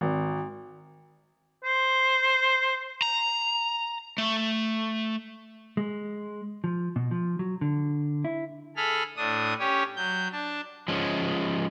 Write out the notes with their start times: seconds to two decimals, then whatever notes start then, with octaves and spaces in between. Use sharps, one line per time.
0.01 G#1
1.64 C5
3.02 A#5
4.18 A3
5.77 G#3
6.64 F3
6.96 B2
7.11 F3
7.39 F#3
7.61 D3
8.25 E4
8.76 G#4 A4 B5 F6
9.16 A2 D4 D#6
9.59 C#4 G4 C#5
9.96 F#3 G6
10.32 D4 A5
10.88 F3 G#3 C#4